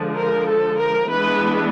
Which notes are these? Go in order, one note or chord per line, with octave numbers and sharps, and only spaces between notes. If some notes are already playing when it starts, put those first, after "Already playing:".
Already playing: D3 F3 G#3
A#4
A4
A#4
E3 G#3 B3 D4 B4